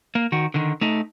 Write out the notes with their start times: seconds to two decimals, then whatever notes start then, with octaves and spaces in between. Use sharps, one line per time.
0.15 A#3
0.32 D#3 F#4
0.54 D3 D#3
0.81 A3 D#4